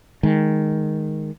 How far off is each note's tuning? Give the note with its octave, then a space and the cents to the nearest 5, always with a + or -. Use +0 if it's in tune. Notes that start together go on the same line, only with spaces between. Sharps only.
D#3 +0 G#3 +0